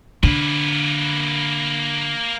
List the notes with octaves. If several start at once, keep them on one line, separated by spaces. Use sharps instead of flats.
D3 A#3 B4